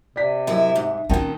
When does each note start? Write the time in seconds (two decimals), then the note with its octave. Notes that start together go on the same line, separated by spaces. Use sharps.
0.16 C3 D5 B6
0.47 F#2 E4 D#5 E5
0.76 G#2
1.10 A#2 D#3 C4 C#4 F#5 G5 A5